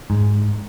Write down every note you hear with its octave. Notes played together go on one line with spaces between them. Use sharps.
G#2